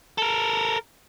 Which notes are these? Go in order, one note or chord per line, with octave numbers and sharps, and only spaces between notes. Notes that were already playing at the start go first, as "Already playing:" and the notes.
A4 A#4